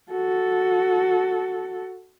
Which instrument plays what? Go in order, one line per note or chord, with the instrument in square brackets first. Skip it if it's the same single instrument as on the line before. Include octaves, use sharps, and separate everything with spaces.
[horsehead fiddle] F#4 A4